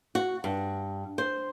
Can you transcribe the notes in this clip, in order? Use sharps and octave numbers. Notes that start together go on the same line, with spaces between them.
F#4
G2
C5